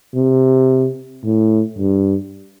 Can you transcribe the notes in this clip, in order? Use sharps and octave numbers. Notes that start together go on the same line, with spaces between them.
C3
A2
G2